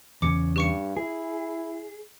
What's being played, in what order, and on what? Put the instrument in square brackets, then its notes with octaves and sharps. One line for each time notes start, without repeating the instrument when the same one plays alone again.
[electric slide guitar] E2 A#2 C#3 [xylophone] D6 C#7
[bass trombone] G2 [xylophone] G4 C#6 C#7
[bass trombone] E4 [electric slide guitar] G#4